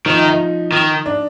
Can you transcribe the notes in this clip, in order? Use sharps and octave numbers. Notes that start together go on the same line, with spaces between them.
D#3 F3
D#4
D#4
D#3
D4